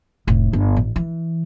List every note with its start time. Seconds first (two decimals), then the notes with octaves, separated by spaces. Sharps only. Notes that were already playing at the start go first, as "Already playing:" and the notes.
0.27 F1 A2
0.53 G1
0.76 A1
0.96 E3